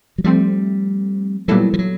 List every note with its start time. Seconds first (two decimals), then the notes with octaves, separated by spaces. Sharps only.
0.18 F#3
0.24 F3 G3 A3 C4
1.48 A#2 F#3 G3 B3 E4 A4
1.74 F3
1.79 F#3